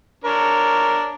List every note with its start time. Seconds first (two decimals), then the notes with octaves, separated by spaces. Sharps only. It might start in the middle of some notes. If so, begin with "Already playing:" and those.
0.24 D4 A#4 C#5